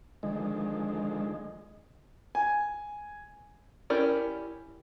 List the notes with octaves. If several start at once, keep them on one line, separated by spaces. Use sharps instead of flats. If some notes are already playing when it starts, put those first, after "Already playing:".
D3 D#3 F3 G#3
G#5
C#4 E4 G4 A#4 D5